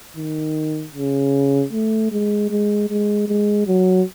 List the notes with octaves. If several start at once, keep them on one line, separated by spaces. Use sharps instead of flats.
D#3
C#3
A3
G#3
G#3
G#3
G#3
F#3